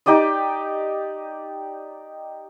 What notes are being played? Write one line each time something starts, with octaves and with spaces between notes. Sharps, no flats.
D#4 G4 D5 D#5